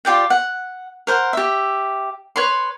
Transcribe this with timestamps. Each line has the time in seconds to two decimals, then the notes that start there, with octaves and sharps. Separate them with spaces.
0.05 F4 G4 D5 G5
0.30 F#5
1.07 A#4 C5 F#5
1.33 G4 E5
2.36 B4 C#5 B5 C6